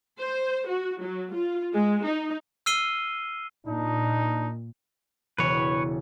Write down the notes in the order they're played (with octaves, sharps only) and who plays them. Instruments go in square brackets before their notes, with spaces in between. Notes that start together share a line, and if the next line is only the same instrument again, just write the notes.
[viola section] C5
F#4
F#3
F4
G#3
D#4
[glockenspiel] E6 F6 C7 D#7 G7
[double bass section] A#2 [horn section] D4 D#4
[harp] E1 C#3 D4 [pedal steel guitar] B4 C#5